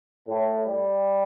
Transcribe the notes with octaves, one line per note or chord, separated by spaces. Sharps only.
A2
G3